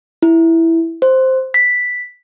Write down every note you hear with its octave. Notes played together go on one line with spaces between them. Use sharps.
E4
C5
B6